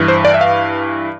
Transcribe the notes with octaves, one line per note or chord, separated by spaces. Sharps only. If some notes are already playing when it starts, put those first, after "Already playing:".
Already playing: G2 E3
C5
D5
E5
F5